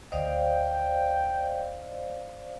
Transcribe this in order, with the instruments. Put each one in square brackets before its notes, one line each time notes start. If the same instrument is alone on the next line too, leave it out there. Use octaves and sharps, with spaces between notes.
[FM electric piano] D2 D#5 [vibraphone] C5 D5 F5 [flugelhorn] G5